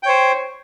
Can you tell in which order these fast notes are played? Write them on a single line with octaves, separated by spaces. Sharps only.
G5 C#5 C5